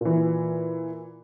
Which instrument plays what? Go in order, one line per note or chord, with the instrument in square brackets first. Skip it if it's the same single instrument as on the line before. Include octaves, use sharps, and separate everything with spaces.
[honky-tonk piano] A#2 E3